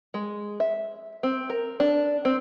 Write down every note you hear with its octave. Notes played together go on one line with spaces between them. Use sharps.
G#3
E5
C4
A#4
D4
C4